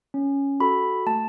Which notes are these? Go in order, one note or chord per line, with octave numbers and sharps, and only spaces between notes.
C#4
F#4 A4 B5
A3 A5